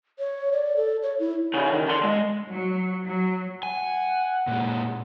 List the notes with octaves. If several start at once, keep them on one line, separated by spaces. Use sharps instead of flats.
C#5
D5
A4
C#5
E4
C#3 D#4
D#3
D3 C6
G#3
F#3
F#3
F#5 G#5
A#2 G#3